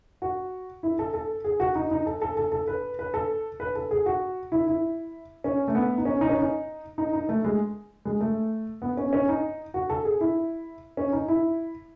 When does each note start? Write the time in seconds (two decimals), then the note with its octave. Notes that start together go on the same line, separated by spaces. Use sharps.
0.22 F#4
0.83 E4
0.99 A4
1.14 A4
1.44 G#4
1.60 F#4
1.75 D#4
1.91 D#4
2.06 A4
2.22 A4
2.37 A4
2.52 A4
2.68 B4
2.99 B4
3.14 A4
3.60 B4
3.75 A4
3.91 G#4
4.06 F#4
4.52 E4
4.67 E4
5.44 C#4
5.68 A3
5.75 B3
5.98 D#4
6.05 C#4
6.21 D#4
6.29 C#4
6.39 D#4
6.98 D#4
7.13 D#4
7.29 A3
7.45 G#3
8.05 G#3
8.21 A3
8.82 B3
8.97 C#4
9.13 C#4
9.29 D#4
9.74 F#4
9.90 A4
10.05 G#4
10.21 E4
10.97 C#4
11.13 D#4
11.28 E4